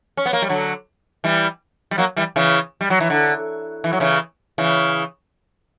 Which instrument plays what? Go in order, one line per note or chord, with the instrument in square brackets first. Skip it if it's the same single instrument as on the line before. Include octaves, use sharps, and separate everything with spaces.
[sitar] C#4
B3
A#3
G3
D3 F#3
E3 G3
G3
F#3 A#3
E3 G3
C#3 E3
G3
F#3
E3
D3
E3
F#3
C#3 E3
C#3 E3